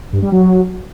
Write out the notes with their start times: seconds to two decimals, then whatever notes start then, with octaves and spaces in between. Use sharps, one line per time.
0.13 G2
0.22 G3
0.32 F#3